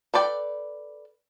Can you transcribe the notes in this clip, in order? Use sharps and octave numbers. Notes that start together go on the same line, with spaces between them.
A4 B4 D5 G5